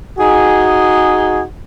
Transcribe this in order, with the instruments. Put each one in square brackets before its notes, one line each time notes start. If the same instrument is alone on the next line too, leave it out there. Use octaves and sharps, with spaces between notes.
[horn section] D#4 F#4 G#4